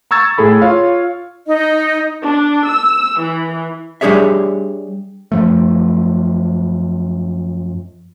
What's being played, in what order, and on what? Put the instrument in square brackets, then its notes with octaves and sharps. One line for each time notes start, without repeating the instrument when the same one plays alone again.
[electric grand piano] A#5 C#6 E6 G#6 A6
A2 G#4 A4 B5
F4 C#5 F5
[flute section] D#4 D#5
[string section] D4
E6
E3
[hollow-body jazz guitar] G3 D4 G4 G#4 C#5 E5
[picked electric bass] F#2 F3 A3